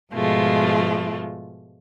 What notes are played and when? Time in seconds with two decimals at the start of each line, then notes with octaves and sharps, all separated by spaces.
0.13 G#2 B2 F3 G#3 A3 F4